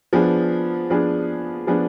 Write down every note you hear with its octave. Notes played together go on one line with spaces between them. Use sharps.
F3 B3 D4 G#4
F3 B3 D4 G#4
F3 B3 D4 G#4